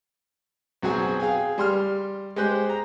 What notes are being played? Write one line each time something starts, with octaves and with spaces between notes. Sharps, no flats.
B1 F#3 C4 F#4 G#4 G#5
G#4 F5 G5 G#5
G3 C6 F6
G#3 G4 C5 F#6
A#5